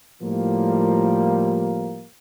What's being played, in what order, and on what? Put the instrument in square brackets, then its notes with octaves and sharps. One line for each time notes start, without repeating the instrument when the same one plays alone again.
[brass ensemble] A2 F3 G3 A#3